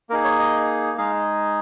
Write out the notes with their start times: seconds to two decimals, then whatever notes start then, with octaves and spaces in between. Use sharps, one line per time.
0.10 A#3 D#4 G#4 A#4
0.24 C#5
0.39 D#5
0.98 G#3 D#4 G#4 F5